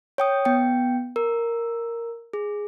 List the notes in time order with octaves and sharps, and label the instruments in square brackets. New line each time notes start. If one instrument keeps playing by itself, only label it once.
[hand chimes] C#5 G5 D#6
B3 G5
A#4
G#4